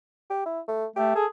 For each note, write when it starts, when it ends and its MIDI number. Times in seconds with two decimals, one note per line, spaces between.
0.30 0.42 67
0.46 0.60 64
0.68 0.85 57
0.96 1.14 57
0.96 1.11 67
1.15 1.25 68
1.15 1.26 69